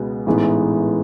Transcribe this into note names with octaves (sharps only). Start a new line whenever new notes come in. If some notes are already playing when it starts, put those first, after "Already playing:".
Already playing: C#2 B2 G#3 B3
A1 G#2 E3 G#3 B3